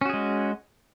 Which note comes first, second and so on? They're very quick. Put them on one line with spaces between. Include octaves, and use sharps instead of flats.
C#4 F#4 G#4 G#3